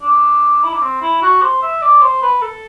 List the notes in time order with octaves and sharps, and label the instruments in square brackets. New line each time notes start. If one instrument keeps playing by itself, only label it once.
[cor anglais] D4
E4
D4
C4
E4
F#4
C5
E5
D5
C5
B4
A4